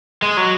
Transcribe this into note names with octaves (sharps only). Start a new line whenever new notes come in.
G#3
F#3